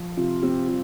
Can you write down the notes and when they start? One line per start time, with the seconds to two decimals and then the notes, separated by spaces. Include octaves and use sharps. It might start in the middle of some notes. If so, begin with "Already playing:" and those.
Already playing: F3
0.17 C3 F4
0.42 C4 G4
0.68 G3 F4